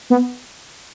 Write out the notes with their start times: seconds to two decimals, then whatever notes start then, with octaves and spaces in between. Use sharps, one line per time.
0.10 B3